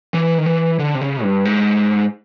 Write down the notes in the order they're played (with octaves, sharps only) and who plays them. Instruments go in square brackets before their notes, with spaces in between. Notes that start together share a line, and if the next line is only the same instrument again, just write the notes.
[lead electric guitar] E3
D#3
E3
D3
C3
C#3
G2
G#2